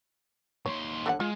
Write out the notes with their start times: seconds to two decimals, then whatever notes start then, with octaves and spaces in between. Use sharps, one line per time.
0.66 D#2 C#5 C6
1.06 D3 G4 F#5
1.20 G#3 F4